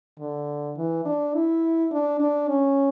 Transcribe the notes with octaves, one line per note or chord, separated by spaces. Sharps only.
D3
E3
D4
E4
D4
D4
C#4